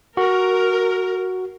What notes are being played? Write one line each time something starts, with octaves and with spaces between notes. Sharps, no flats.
F#4 A#4